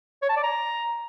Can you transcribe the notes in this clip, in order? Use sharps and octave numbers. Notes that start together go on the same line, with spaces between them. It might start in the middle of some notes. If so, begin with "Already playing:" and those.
C#5
A5
D5
A#5